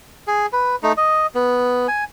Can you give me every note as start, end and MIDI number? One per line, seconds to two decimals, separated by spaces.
0.27 0.46 68
0.53 0.76 71
0.83 0.92 57
0.83 0.92 63
0.97 1.27 75
1.35 1.87 59
1.88 2.04 80